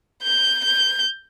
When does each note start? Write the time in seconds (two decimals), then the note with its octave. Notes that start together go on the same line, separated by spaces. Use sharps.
0.23 G6
0.65 G6